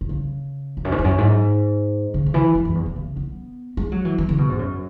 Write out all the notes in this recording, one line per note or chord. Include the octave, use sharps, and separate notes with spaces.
B2
C#3
E2
F#2
G#2
E2
F#2
G#2
C#3
C#3
E3
G#3
F#2
E2
F#2
C#3
B3
G#3
F#3
E3
E3
C#3
B2
G#2
F#2